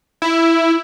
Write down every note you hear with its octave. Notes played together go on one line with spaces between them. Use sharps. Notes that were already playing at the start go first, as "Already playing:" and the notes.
E4